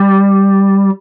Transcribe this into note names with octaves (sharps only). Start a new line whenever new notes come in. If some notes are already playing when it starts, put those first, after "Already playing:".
Already playing: G3